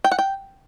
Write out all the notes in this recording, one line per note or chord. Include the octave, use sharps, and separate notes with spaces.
G5
F#5
G5